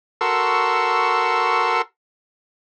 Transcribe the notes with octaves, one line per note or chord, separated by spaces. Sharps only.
F#4 A4 A#4 C6 C#6 E6